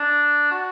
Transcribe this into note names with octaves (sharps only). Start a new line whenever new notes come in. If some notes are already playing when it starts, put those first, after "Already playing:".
Already playing: D4
F#4